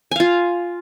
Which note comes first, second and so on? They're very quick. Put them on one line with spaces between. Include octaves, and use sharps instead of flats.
G#5 F5 F4